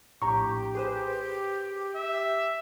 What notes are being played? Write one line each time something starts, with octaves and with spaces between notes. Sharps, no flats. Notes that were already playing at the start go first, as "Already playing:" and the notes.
A#1 A2 G4 A#5 C#6
G#4 B4 C5
E5